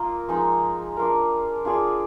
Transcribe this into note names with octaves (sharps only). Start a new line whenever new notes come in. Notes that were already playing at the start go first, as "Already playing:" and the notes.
Already playing: A#3 F4 A#4 D#5
F3 G#3 D#4 G#4
D4 F4 A#4
D4 F4 G#4 D5